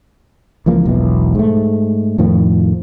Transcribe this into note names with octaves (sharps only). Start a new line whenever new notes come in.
C#2 E3 F3 A#3
E1 B1 E3
G#2 A3
F2 A2 D#3 F3